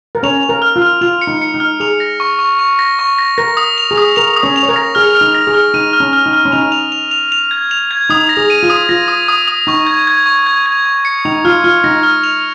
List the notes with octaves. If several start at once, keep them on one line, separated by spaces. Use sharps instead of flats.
A#4
C#4 C#5 F7
F7
A#4
F6
F4
F6
F4 F7
C#7
D#4
C#7
D#4
F6
G#4 F7
A#6
C#6
C#6
C#6
A#6
C#6
A#6
A#4 A#6
D#6
F7
G#4
D#6
A#4 F7
D#6
C#4 C#5
F7
C#5
A#4
A#6
G#4 F6
F6
D#4
A#6
G#4
F6
D#4 D#7
F6
C#4
F6
D#4
F6
C#4
D#4 F7
F7
F7
F7
F7
G#6
F7
G#6
D#4 D#6
A#6
G#4
D#7
F4
D#6
F4 A#6
D#6
D#6
D#6
D#4 C#6
G#6
G#6
C#6
G#6
G#6
C#6
C#7
D#4 F7
F4 F6
F4 F6
D#4 A#6
F6
F7